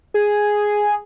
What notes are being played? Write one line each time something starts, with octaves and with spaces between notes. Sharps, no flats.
G#4